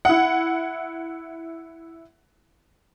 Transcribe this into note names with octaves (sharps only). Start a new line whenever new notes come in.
E4 F#5